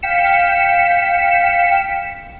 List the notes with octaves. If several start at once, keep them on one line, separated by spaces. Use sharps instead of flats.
F5 G5 B6 C#7 E7